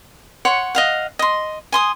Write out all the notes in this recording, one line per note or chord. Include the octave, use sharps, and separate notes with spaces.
C#5 F#5 C6
D#5 F5 F#5
D#5 C6
G#5 C6 D#6